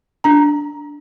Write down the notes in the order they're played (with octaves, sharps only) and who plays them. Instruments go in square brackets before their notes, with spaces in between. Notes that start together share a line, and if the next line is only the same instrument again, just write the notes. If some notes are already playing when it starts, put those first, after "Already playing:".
[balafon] D4 A#5